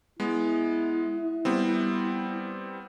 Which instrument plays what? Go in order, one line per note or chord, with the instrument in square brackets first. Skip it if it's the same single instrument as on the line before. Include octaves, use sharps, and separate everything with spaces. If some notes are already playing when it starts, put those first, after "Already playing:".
[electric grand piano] G#3 B3 [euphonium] E4
[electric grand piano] G3 B3 C4